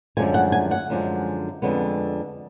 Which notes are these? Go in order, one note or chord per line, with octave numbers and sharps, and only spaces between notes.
F#2 D3 F3 G#3 G#5
F#5
G#5
F#5
F#2 D3 F3 G#3
F2 D3 G#3 B3